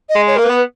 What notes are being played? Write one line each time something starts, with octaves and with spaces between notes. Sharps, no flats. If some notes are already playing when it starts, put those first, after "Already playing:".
D#5
G#3
C#5
A#3 A#4
B4
B3